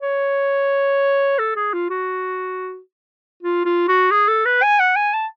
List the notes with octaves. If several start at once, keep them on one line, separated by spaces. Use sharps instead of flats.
C#5
A4
G#4
F4
F#4
F4
F4
F#4
G#4
A4
B4
G#5
F#5
G#5
A5